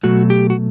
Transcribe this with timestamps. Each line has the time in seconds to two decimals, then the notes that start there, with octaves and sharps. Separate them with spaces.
0.03 B2 F#3 A3 F#4
0.30 G4
0.50 F#4